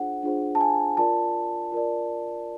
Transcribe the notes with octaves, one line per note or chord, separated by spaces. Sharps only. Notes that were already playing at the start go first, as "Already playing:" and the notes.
Already playing: D4 F4 G#4 C5 F#5
D4 F4 G#4 C5
A5
G#5
F4 A#4 D5 A5
F4 A#4 D5